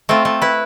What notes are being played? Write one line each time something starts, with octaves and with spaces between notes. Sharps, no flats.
A3 C4 F4
A3
E4 B4